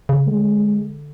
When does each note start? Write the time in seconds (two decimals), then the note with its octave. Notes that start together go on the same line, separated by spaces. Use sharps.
0.09 C#3
0.27 D3 G#3